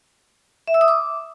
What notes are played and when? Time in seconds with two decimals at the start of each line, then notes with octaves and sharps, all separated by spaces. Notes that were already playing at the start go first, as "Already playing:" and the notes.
0.67 E5
0.74 E6
0.81 D#6
0.88 D6